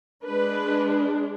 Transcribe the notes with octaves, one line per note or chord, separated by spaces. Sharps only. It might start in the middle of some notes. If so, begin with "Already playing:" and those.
G#3 D4 B4